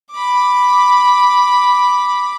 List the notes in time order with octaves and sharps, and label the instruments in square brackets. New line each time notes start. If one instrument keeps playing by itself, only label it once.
[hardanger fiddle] B5 D6